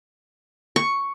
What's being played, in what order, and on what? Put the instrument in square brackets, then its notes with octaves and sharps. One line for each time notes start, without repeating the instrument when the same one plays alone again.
[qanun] C#6